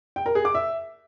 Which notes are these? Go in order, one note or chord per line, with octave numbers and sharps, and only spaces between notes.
G5
A#4
G#4
D6
E5